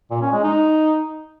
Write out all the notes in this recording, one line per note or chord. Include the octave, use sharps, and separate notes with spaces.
A#2
C#4
G#3
D#4